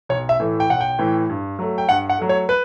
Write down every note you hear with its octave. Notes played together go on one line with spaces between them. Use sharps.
B1 C#5
E5
A2 E3 A3
G5
B1 F#5
G5
A2 E3 A3
G2
F#3 A3
G5
G2 F#5
F#5
F#3 A3
C#5
B4